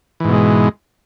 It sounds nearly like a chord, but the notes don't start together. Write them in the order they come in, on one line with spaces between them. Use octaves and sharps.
E3 G#2 B2 G#3